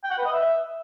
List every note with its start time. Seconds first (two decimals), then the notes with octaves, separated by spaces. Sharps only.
0.04 G5
0.11 F#5
0.18 B4
0.25 D#5
0.32 E5